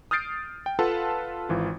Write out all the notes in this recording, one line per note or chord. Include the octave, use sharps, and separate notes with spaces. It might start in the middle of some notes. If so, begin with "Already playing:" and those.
D#6 F6 G6 A6 C7 D7
G5
F4 A4 B4 F5 F#5 A5
G#1 E3 F4